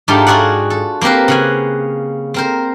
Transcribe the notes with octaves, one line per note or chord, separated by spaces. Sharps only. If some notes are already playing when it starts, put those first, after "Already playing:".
G#2 A3 D4 D#4 F4 G4
F4 F#4 G#4 D5 F#5
A4
A#3 C4 G4 A#4 B4
C#3 F#5 G#5
C4 A#4 C5